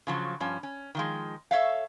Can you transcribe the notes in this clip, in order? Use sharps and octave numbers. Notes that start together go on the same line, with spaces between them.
C#3 F3 F#3
G2 F3 C#4
C#4
D#3 F3 G#3
A4 C#5 E5 F5